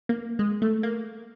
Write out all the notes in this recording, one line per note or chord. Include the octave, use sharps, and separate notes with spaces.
A#3
G#3
A3
A#3